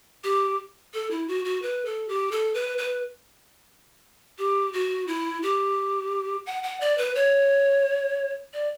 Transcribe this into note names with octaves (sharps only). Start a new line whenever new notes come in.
G4
A4
E4
F#4
F#4
B4
A4
G4
A4
B4
B4
G4
F#4
E4
G4
F#5
F#5
D5
B4
C#5
D5